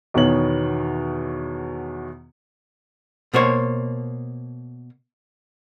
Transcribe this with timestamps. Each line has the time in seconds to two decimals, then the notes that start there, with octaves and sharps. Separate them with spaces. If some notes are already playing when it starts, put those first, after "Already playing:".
0.14 E2 B2 D#3 B3 C#5 F#7
3.34 B2 A#3 C5 C#5